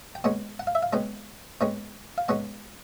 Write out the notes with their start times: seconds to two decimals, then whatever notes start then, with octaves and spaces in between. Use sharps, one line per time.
0.15 G5
0.24 B2 G#3 C#4 F#5
0.59 F#5
0.67 F5
0.75 E5
0.83 F5
0.93 B2 G#3 C#4 G5
1.61 B2 G#3 C#4 G5
2.18 F5
2.28 B2 G#3 C#4 F#5